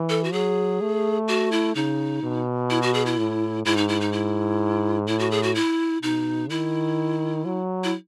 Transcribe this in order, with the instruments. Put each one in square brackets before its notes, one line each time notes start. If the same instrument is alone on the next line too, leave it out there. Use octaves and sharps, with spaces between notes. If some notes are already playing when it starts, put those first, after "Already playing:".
Already playing: [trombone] E3
[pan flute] A4
F#4
[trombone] F#3 [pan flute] G#4
[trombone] A3
[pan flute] F#4
E4
[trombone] C#3 [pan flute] D#4
[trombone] B2
[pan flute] E4
F#4
G#4
E4
[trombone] A2
[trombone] G#2 [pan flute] E4
[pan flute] D#4
E4
D#4
E4
[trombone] A2 [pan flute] E4
[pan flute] F#4
G#4
F#4
E4
[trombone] B2 [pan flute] D#4
[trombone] D#3 [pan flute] E4
[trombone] F#3
[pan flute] E4